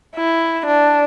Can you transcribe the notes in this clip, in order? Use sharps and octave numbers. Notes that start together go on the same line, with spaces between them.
E4
D4